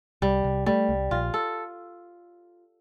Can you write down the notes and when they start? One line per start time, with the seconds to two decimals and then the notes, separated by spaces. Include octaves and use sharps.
0.22 C2 G3
0.44 C2
0.66 G3 A3
0.89 C2
1.11 A#1 F4
1.34 A4